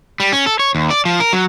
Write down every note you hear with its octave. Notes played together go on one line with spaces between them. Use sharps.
G3
C#4
A4
C#5
D#2
D5
F3
A#4
F#3